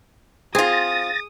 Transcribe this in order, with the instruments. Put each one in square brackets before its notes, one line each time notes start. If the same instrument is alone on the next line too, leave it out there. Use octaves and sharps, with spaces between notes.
[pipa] C4 F4 [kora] G#4 [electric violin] D#6 [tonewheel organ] A6 A#6